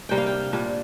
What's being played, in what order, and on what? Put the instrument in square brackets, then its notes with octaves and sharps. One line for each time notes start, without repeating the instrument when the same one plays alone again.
[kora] C3 G3 A#3 D4 G5
F5
G5
A#2 G3 D4